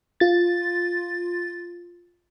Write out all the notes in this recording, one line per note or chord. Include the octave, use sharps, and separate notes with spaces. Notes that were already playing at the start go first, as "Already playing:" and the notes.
F4 A6